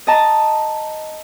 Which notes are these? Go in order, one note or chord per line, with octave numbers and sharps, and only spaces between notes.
D#5 A5 A#5